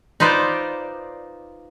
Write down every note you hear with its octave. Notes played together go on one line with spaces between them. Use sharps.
D#4 F4 B4 C5 D5